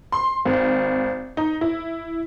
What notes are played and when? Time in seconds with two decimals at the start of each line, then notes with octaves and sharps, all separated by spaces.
0.12 C6
0.45 G#1
1.37 D#4
1.61 E4